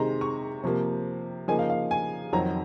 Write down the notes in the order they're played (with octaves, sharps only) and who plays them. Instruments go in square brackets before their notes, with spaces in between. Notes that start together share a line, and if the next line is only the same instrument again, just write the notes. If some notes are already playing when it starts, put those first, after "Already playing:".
Already playing: [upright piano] C3 D#3 G#3 D#4 A#5 C6
C#6
C3 F3 A#3
C#3 F3 A#3 D#4 G#5
F5
F5
G#5
F2 D#3 F#3 C4 A#5